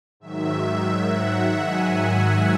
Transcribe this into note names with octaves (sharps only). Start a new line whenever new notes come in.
G#2 D#3 F#3 E5
E5
F#5
F#5
G#5
F#5